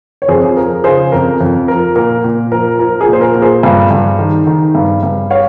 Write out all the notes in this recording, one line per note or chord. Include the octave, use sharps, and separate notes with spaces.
C#5
F2 G#4 C5
G#4
F3 A#4
C#3 G#4 C5
F2 A#4
F2
F3 A#4
A#2 A#4
A#2
F3 A#4
F3 A#4
G#4
A#2
C5
A#4
A#2
G#4 C5
G2
G2
D#3
D#3
G2
G2
C#5 F5